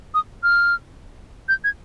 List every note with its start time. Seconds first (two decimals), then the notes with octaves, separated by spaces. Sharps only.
0.14 D#6
0.43 F6
1.48 G6
1.64 G#6